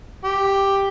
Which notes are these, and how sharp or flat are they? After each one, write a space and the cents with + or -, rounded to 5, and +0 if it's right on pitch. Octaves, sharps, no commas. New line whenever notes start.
G4 +5